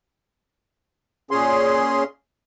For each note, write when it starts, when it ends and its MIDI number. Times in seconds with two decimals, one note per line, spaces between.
1.31 2.04 46
1.31 2.04 61
1.31 2.04 68
1.31 2.04 84